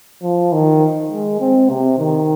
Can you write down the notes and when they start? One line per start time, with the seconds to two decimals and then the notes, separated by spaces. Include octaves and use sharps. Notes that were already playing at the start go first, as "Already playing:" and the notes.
0.23 F3
0.53 D#3
1.11 G#3
1.41 C4
1.69 C3
1.99 D#3